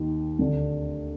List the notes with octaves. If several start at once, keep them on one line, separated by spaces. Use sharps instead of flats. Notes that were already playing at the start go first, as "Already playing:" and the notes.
Already playing: D#2 D#3
D2 D3